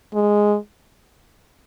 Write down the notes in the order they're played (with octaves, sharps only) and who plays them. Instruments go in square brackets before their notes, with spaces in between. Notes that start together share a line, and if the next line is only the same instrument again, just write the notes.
[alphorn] G#3